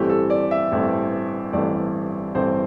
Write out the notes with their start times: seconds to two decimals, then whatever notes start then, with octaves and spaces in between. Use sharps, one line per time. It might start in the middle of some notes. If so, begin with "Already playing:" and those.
Already playing: A1 G2 E3 A3 C4 G4
0.09 A4
0.30 D5
0.51 E5
0.72 A1 G2 E3 A3 C4
1.53 A1 G2 E3 A3 C4 D5
2.35 A1 G2 E3 A3 C4 C5